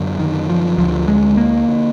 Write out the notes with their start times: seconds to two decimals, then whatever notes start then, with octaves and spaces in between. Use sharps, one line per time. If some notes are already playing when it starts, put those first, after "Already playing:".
Already playing: F#2 D3
0.19 D#3
0.49 F3
0.78 D2 D3 F3
1.08 G#3
1.37 A#3
1.68 D3